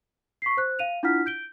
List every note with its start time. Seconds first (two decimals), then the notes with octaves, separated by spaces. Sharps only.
0.42 C#6 B6 C7
0.57 C5 F#6
0.79 F5 D#7 F7
1.03 D4 E4 F4 F#5 F6 B6
1.26 G6 D7 G7